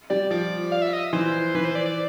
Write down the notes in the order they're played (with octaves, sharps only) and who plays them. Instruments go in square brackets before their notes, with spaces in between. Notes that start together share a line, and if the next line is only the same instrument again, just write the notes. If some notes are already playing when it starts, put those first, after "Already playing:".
[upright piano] G3 [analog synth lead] D5
[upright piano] F3 [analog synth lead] D5
[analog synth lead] F5
E5
D#5
[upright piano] E3 [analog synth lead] C5
[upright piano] E3 [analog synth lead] B4
[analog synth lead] C5
D5
D5